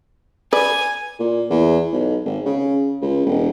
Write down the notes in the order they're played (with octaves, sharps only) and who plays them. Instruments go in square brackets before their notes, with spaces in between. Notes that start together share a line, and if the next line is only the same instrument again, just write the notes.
[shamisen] B4 D5 [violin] G#5
[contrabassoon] A#2
E2
B1
G#1
C#3
C#2
E1